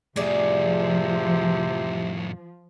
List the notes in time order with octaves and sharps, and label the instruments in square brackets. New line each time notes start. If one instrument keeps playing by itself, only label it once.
[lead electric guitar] F2 A2 [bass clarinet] C3 [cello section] F3 [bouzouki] G#4 D5